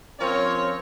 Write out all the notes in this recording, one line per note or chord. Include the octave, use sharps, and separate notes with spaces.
F3 C4 C#4 A#4 C#5